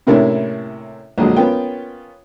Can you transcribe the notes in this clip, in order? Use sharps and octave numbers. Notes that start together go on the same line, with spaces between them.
A2 C3 A#3 C#4 D4 E4
A#1 D3 F#3 G#3
A#3 B3 C#4 F4 G5